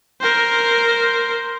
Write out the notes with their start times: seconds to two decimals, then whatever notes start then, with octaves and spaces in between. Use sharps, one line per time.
0.21 A#4 C5